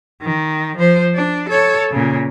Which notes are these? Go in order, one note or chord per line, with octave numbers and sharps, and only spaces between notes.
D#3
F3 C5
D4
A4 C#5
A#2 C#3